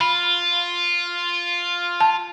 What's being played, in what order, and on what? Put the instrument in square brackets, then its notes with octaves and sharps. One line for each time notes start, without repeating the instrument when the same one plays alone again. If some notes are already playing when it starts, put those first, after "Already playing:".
[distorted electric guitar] F4 [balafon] B5
[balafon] A5